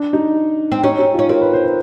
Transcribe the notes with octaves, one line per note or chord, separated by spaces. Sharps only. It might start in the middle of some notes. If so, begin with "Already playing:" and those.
Already playing: D4
D#4
C4
C#4 D#4
D#4
C#4 F4
C4 A#4
B4
C5
B4